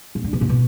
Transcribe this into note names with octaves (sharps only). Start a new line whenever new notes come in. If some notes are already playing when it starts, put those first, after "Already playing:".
A#2
D3
B2
A#2
B2